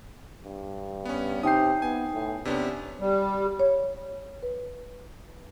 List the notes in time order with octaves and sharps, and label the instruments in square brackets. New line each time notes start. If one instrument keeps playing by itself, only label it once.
[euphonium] G2
[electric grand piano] B3 C#4
[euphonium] C3 [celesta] D#4 G5 G6 [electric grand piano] D#6 C7
[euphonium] B3 [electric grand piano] G#5
[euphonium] A2
[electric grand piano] C3 B3 C#4 [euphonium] D4
[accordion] G3
[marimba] C#5
B4